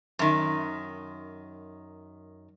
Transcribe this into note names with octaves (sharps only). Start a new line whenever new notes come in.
F#2 D#3